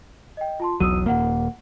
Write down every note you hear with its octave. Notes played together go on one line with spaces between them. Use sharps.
D#5 G5
F4 A5 C6
E1 B1 F#3 D#6 E6 D#7
D#1 F2 A#3 F5 F#5